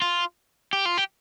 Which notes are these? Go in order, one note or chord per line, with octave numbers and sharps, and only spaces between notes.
F4
G4
F4
G4